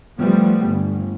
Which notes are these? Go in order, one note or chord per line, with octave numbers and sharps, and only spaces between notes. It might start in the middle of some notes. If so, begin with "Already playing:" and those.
F3 G3 A3 B3
G1